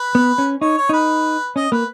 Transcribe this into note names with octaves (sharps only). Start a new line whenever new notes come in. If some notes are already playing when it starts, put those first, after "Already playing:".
Already playing: B4
B3
C#4
D#4 C#5
C#5
D#4 B4
C#4 D#5
A#3 B4